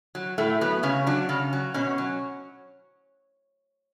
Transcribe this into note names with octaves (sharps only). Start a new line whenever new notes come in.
F#3
A2 A3
F#3 B3
C#3 C#4
F#3 D4
C#3 C#4
F#3
B2 C#4
F#3